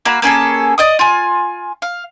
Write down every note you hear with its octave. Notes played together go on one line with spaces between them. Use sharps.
A#3 F#4 F5 B5
A#3 C#4 G#4 A4
D5 D#5 D#6
F4 G#5
F5